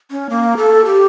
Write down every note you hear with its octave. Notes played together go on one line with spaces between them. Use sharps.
C#4
A#3
A4
G4